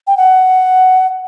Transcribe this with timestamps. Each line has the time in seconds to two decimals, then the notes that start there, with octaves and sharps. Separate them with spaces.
0.07 G5
0.17 F#5